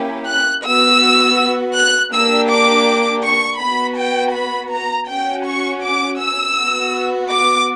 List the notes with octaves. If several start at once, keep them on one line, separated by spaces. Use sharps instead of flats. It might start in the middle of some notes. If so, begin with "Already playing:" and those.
Already playing: A#3 C#4 E4 G4
F#6
B3 F#4 E6
F#6
A#3 D4 G4 E6
D6
C#6
B3 F#4 B5
G5
B5
A#5
C#4 F#4 G5
C#6
D6
E6
B3 F#4
D6